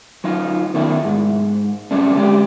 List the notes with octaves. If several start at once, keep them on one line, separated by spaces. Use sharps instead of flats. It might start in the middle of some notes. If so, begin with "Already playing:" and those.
F#3 D#4 F4
B2 D#3 A3 D4 E4
G#2
F#3 G3 A3 C#4 D4
D3 G3 G#3 G4